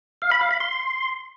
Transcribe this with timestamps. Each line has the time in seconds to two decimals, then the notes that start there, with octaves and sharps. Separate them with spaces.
0.22 F5
0.31 B5
0.41 F5
0.51 B5
0.60 C6